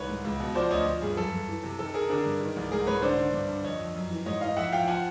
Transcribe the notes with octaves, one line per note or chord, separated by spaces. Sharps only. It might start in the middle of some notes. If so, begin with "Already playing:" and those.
Already playing: C2 D#3 B4 C#5
G#2
C#2
B2
F3 C5 D5
D2 C#5 D#5
F3
G2 G#4
F#2 A4
F#2
E3
C3
D#3 A4
D#3 G#4 A#4
D3 G#4 A#4
G2
D#3
C2
G#2 G#4 A#4
G#2 B4 C#5
D3 C5 D5
D3
G2
D3
F2 C#5 D#5
F2
F#2
E3
G#2 C#5 D#5
E3 D#5 F5
F2 E5 F#5
F3 F5 G5
F3 F#5 G#5